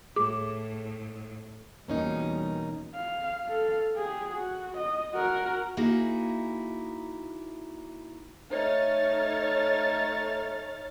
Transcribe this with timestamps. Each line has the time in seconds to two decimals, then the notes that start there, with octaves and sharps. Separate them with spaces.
0.16 A2 G#4 D6
1.88 E2 B2 G3 A#3 C#4 D#4
2.95 F5
3.46 A4 F5
3.97 G4 G#4
4.31 F#4
4.77 D#5
5.14 F#4 A#4
5.77 A#3 D#4 E4 F#4 G#4
8.51 A3 D#4 C#5 F6 A6